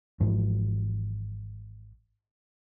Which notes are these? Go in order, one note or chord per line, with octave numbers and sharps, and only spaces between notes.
G#1 G#2 E3 F3